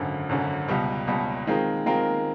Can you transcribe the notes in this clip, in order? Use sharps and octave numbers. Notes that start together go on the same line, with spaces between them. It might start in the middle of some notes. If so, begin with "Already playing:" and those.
Already playing: G#1 F#2 D3
G#1 F#2 D3
C#2 B2 G3
C#2 B2 G3
D#3 G#3 C4 F4 A#4
D#3 G#3 C4 F4 A#4